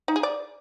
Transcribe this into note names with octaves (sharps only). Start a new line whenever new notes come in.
D#4
G#4
D5